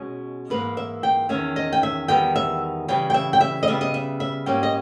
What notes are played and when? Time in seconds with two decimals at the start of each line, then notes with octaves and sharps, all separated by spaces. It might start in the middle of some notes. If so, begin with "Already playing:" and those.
Already playing: B2 G#3 C#4
0.50 G#2 E3 A#3 B4
0.77 E5
1.03 G5
1.29 E2 D#3 A#3 C#4 E5
1.56 D#5
1.72 G5
1.83 E5
2.08 E2 D#3 G3 B3 G5
2.36 E5
2.88 C#3 E3 G3 G5
3.10 G5
3.14 E5
3.33 G5
3.41 E5
3.63 D#5
3.67 C#3 G3 B3 E5
3.81 D#5
3.94 E5
4.20 E5
4.46 G#2 G3 A#3 C#4 G5
4.63 D#5